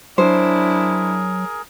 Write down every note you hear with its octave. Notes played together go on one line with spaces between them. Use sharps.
F#3 D4 E4 G#4 A#4 C5